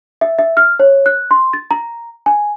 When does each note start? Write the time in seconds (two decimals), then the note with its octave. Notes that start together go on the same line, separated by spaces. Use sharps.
0.21 E5
0.39 E5
0.57 F6
0.80 C#5
1.06 F#6
1.31 C6
1.53 A6
1.71 A#5
2.26 G#5